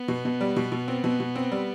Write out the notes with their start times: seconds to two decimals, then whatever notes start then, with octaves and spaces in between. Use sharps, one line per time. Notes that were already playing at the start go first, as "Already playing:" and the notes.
Already playing: B3
0.08 B2
0.25 B2
0.41 G3
0.56 B2
0.72 B2
0.88 C4
1.04 B2
1.20 B2
1.35 C4
1.52 G3